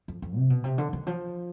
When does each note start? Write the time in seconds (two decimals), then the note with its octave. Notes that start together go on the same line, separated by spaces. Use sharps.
0.08 F2
0.22 F2
0.37 C3
0.50 B2
0.64 C3
0.78 D3
0.93 D#3
1.07 F3